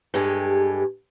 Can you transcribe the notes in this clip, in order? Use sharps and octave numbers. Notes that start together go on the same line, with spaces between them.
G2 G#3 G4 A4 G#5